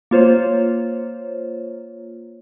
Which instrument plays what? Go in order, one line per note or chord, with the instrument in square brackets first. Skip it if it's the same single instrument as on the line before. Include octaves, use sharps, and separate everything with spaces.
[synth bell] A#3 F4 C5 C#5